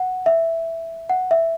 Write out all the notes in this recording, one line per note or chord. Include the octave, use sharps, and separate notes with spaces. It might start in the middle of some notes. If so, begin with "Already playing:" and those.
Already playing: F#5
E5
F#5
E5